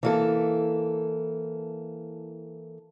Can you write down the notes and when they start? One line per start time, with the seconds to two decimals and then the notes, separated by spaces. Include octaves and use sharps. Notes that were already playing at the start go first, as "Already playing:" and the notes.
0.03 E3 A#3 A4